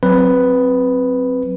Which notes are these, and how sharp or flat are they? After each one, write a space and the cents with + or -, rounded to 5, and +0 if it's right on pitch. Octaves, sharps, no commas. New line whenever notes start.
F#3 +0 C4 +0 B4 +0